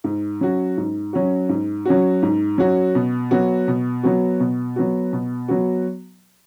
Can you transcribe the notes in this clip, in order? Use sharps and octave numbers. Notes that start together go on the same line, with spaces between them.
G#2
F#3 C#4 F#4
G#2
F#3 C#4 F#4
G#2
F#3 C#4 F#4
G#2
F#3 C#4 F#4
B2
F#3 B3 F#4
B2
F#3 B3 F#4
B2
F#3 B3 F#4
B2
F#3 B3 F#4